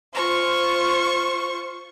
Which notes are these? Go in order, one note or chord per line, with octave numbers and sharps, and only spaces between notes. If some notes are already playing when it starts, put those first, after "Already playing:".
F4 C5 C#6